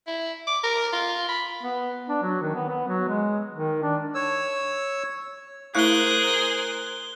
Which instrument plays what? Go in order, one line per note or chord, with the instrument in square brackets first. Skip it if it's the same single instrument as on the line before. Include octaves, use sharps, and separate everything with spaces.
[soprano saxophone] E4
D6
A#4
F4
B5
[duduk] B3
D4
F#3
D#3
B3
B3
F#3
G#3
D#3
D4
[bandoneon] C#5 E6
[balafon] A3 E4 F5 [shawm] G#4 [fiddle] A#4 C5 [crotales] F#6 G7